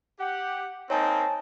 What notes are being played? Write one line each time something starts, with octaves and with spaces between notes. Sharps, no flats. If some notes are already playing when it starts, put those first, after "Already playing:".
G4 F#5
A#3 C4 D#4 C#5 G#5 A5